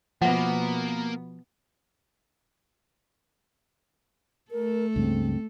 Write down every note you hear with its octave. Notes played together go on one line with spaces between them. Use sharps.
B2 F3 A#3 B3 E5 F#5
A3 A4 A#4
C#2 G2 C#3 C4